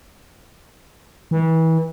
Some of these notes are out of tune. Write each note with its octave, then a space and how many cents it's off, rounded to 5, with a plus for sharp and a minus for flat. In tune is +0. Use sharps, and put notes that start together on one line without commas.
E3 -30